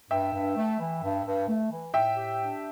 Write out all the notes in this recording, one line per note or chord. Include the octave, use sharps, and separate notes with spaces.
G2 E5 G5
G2
A3
E3
G2
G2
A3
E3
A2 E5 G5
G4
D4